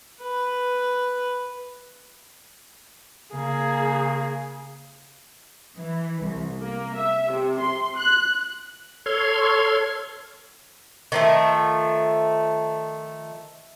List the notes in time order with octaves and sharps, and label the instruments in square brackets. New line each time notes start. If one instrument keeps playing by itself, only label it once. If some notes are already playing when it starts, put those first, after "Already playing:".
[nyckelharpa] B4
[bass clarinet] C#3 [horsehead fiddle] A#3 G#4
[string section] E3
C2
A#3
E5
C3
C6
F#6
[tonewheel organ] A4 C#5 C6 F6 G#6
[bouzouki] D#3 F3 A3